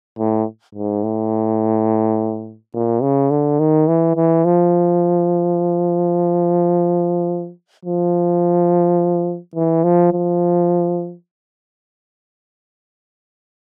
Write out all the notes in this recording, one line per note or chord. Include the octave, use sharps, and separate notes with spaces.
A2
G#2
A2
A#2
C#3
D3
D#3
E3
E3
F3
F3
E3
F3
F3